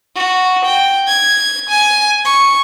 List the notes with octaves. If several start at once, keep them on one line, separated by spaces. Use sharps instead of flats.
F#4
G5
G#6
G#5
C#6